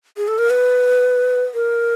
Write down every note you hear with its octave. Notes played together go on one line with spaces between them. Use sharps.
G#4
A4
A#4
B4
A#4